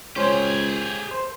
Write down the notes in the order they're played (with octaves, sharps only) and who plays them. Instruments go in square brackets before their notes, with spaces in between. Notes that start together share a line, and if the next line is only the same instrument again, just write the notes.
[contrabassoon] C#2 [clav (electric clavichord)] C#4 C5 C#5 [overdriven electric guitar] G4 G#4
[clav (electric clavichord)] C5